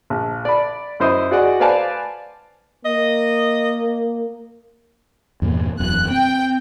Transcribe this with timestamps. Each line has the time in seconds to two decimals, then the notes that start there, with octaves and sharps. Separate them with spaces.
0.10 A#1
0.45 D5 B5
1.00 F#2 E4 C5 D#5 D#6
1.31 F#4 G#4 D5 D#5 F#5
1.60 B4 C5 D5 F5 G#5 A5
2.85 A#3 D#5
5.42 E2 G2 A#2
5.80 E1 F#2 F#6
6.10 C4 G5